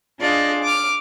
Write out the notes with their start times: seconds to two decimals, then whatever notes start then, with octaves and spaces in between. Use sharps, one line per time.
0.20 D4 F4 G#4 D5 D#5
0.64 D6 F6